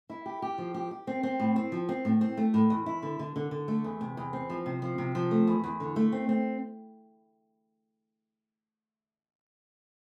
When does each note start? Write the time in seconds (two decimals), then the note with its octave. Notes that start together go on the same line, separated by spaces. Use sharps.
0.10 E4
0.26 G4
0.42 G4
0.58 F3
0.74 G4
0.91 G4
1.07 C4
1.23 C4
1.40 A2
1.56 C4
1.72 F3
1.89 C4
2.05 A2
2.21 C4
2.37 A3
2.54 A2
2.70 E2
2.86 E4
3.03 D3
3.19 D3
3.36 D3
3.51 D3
3.68 A3
3.84 E2
4.01 C3
4.17 E2
4.33 C4
4.50 F3
4.66 C3
4.82 F3
4.98 C3
5.15 F3
5.31 A3
5.47 E2
5.64 E2
5.80 D3
5.96 A3
6.12 C4
6.29 C4